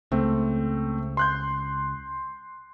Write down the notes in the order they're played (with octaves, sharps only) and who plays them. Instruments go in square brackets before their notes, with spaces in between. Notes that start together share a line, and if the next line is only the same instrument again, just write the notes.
[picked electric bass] C#2 [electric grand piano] A3 C4
[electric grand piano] C6 F#6 G6